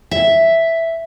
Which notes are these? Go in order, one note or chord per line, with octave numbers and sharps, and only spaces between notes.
E5